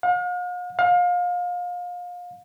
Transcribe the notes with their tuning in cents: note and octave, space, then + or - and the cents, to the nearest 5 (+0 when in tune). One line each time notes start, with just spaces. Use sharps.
F5 +45
F5 +30